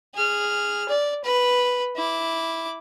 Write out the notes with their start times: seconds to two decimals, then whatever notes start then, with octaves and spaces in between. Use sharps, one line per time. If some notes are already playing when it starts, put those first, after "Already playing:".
0.14 G#4 F6
0.88 D5
1.24 B4
1.96 E4 D6